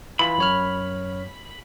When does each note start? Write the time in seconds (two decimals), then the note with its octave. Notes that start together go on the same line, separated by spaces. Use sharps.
0.19 E3 F4 B5
0.38 F#2 C#5 F6